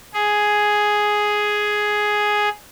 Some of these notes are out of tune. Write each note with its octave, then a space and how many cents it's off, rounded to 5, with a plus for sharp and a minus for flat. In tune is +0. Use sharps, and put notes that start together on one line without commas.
G#4 +5